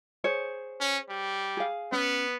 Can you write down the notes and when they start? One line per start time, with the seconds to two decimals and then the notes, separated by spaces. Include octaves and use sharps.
0.24 G#4 C5 C#5
0.81 C#4
1.09 G3
1.57 G#4 F5
1.92 B3 C#4